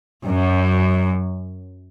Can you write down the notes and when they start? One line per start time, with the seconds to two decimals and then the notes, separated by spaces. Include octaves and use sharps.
0.25 F#2